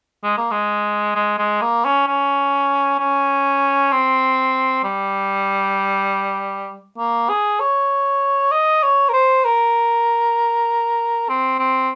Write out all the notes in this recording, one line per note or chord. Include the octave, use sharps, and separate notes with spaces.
G#3
A#3
G#3
G#3
G#3
A#3
C#4
C#4
C#4
C4
G3
A#3
G#4
C#5
D#5
C#5
A#4
C5
A#4
C4
C4